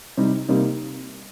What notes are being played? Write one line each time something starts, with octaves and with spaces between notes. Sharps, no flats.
C3 G3 D#4
C3 G3 A#3 D#4